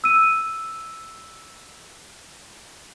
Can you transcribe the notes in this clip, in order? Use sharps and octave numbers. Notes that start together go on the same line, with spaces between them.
E6 D#7